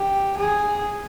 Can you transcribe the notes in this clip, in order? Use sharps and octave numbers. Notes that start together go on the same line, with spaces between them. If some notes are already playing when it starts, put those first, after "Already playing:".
Already playing: G4
G#4